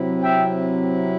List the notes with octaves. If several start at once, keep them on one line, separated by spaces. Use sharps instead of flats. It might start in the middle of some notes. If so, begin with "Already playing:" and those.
Already playing: C3 F#3 C4 E4
E5 G5